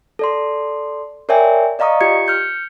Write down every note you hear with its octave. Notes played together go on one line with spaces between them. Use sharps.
A4 D5 C6
A#4 C#5 D5 E5 G5 G#5
D5 D#5 F5 A#5 C#6 D#6
F4 G4 G#6 C#7
F6 G6 C#7